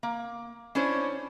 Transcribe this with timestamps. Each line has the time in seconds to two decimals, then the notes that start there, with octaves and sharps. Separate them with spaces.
0.03 A#3
0.75 C#4 D4 E4 C5 C#5